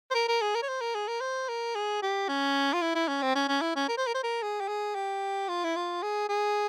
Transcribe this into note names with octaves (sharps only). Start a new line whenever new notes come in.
C5
A#4
A#4
G#4
A#4
C#5
C5
A#4
G#4
A#4
C5
A#4
G#4
G4
C#4
F4
E4
E4
C#4
C4
C#4
C#4
E4
C#4
A#4
C5
A#4
C5
A#4
G#4
G4
G#4
G4
F4
E4
F4
G#4
G#4